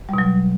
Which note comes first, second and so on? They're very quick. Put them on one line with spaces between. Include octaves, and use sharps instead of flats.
G3 B2 F#3